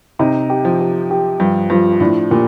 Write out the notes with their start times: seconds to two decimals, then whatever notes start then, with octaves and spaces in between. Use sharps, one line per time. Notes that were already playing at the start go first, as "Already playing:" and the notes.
0.19 C3 D#4
0.50 G4
0.65 F3
0.80 G4
1.11 G4
1.40 G2 F3
1.70 G2 F3
2.00 A2 D4
2.31 A#2 G4